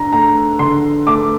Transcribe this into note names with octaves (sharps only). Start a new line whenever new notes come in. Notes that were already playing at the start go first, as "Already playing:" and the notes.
Already playing: D3 D4 A#5
A3 A#5
D3 C6
A3 D6